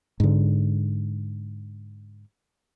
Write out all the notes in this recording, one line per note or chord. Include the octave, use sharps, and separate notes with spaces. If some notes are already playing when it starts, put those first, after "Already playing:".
G#2 D3